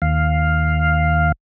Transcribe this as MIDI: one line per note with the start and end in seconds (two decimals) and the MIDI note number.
0.02 1.32 39
0.02 1.32 77